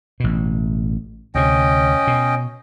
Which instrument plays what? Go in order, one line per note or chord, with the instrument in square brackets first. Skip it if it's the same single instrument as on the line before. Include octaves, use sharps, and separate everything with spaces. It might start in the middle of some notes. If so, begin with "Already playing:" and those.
[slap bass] A1 B2
[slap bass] D2 C3 [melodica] C#4 D#5 G5
[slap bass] B2